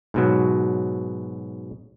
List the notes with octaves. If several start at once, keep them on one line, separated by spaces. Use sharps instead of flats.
G#2 B2 F#3